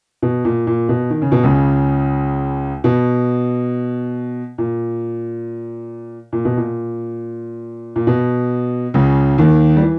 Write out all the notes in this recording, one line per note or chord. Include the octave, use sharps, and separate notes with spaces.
B2
A#2
A#2
B2
D#3
C#3
B2
C#2 C#3
B2
A#2
A#2
B2
A#2
A#2
B2
C#2 C#3
D#2 D#3
G3
E3